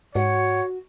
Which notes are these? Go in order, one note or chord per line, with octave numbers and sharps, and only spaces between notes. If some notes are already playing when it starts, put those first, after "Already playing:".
G#2 F#4 C#5 F#5